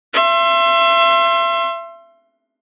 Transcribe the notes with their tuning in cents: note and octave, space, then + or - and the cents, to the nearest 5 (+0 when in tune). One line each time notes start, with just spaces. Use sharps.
E5 +35 C6 +25